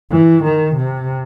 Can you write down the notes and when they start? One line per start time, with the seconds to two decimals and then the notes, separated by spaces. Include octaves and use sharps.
0.11 E3
0.44 D#3
0.76 C3